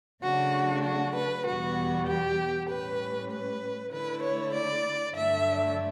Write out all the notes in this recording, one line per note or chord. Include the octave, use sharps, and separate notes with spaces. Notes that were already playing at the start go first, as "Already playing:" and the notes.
C#3 F#3 A3 D4 F#4
F#4
B4
E2 B2 G3 B3 F#4
G4
A2 G3 C#4 B4
B4
D3 A3 E4 B4
C#5
D5
G2 D3 F#3 A3 D4 E5